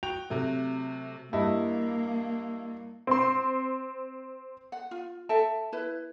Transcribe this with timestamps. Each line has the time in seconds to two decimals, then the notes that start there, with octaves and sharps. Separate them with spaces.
0.03 F#4 G5 F7
0.30 C3 F#3 A3
1.33 G2 A#3 E4 D#5
3.07 C4 C6
4.72 F#5
4.91 F4
5.29 A4 E5 G5 A5
5.72 E4 B4